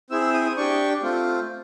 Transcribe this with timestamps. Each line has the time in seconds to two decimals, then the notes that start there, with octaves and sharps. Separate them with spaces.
0.10 C4 E4 G#4 E6
0.21 E6
0.34 D#6
0.45 D#6
0.57 D4 G4 C#6
1.03 A3 C4 F4